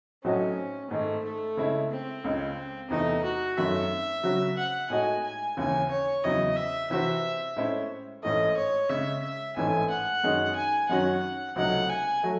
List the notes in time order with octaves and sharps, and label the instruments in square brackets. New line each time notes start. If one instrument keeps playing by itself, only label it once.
[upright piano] A2 F#3 C4 D#4 F#4 [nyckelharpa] C#4
[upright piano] G#2 D#3 G#3 [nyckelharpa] A3
[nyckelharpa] A3
[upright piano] C#3 G#3 C4 E4
[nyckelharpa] C4
[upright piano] C#2 C#3 G#3
[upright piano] E2 C3 E3 A3 [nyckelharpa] D#4
[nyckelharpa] F#4
[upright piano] G#1 F#2 D#3 F#3 A3 [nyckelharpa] E5
[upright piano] C#3 F#3 C4 F#4
[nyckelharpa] F#5
[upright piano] A2 G#3 D#4 F#4 [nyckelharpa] G#5
[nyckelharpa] G#5
[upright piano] D#2 C#3 E3 [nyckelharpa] G#5
[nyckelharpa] C#5
[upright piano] E2 C#3 F#3 C4 E4 [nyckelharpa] D#5
[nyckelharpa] E5
[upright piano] C3 E3 C4 F#4 C5 [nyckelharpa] E5
[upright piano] A2 G#3 C#4 E4 C5
[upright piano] A1 G#2 E3 A3 [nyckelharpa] D#5
[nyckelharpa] C#5
[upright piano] C#3 G#3 C#4 [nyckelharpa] E5
[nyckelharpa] E5
[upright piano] A1 G#2 E3 A3 [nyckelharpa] G#5
[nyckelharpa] F#5
[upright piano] F#2 D#3 G#3 D#4 G#4
[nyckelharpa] G#5
[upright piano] F#2 D#3 F#3 C#4 F#4 [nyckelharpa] F#5
[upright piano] C#2 C3 F#3 A3 D#4 [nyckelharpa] F#5
[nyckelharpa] G#5
[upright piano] F#3 A3